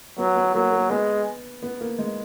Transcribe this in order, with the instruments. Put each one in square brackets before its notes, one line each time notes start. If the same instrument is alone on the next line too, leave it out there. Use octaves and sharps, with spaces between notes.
[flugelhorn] F#3 [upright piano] B3
[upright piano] B3
[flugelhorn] F#3 [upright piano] A#3
[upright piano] A#3
[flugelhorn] G#3 [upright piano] B3
[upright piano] B3
A#3
G#3